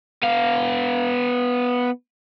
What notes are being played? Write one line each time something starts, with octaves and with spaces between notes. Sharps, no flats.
B3 F5